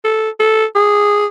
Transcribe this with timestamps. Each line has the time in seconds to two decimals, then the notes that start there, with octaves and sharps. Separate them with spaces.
0.05 A4
0.40 A4
0.76 G#4